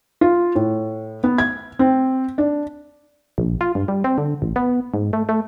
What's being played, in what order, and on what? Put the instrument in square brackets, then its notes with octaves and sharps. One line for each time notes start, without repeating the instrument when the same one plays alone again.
[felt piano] F4
A2
B3
G#6
C4
D4
[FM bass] A#1
F4
G2
G3
C4
D3
A1
B3
G#2
A3
A3